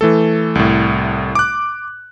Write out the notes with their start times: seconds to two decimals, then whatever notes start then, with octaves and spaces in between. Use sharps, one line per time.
0.01 E3 A3 A4
0.55 C2 A2
1.35 D6 F#6